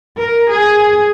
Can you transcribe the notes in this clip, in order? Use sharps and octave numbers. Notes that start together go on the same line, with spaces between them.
A#4
G#4